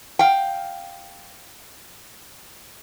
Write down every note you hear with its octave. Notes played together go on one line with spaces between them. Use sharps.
F5 G5